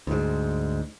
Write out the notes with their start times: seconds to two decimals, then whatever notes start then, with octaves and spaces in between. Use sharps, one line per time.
0.07 D2 G#2